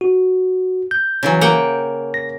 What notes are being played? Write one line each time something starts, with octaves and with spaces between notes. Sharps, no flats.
F#4
G6
C#3 E3 F#3
A#3 F#5 G5
A#6